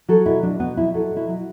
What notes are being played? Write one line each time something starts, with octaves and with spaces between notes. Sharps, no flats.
F#3 A4
B2 E4
F#3 D4
B2 B3
F#3 E4
F#3 A4
B2
E4
F#3